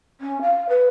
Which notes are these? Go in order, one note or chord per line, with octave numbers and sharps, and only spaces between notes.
C#4
F5
B4